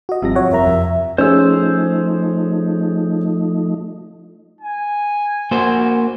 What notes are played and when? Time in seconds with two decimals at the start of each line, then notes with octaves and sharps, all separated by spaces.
0.09 F#4 D#5
0.22 G1 C3 F3 G3 A#6
0.35 F#3 C#5 F#5
0.51 F#2 A#4 E5 A#5
0.67 F2
1.18 F3 A3 C#4 D#4 G#4 C5 E6
4.61 G#5
5.51 A#3 F#4 C5